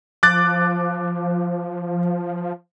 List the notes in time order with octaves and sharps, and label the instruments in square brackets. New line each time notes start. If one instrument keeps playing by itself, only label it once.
[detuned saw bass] F3 [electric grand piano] D6 F#6 A6